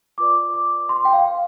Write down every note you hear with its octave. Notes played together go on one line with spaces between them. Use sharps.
F4 B4 D5 D6
D6
C6
G5
F5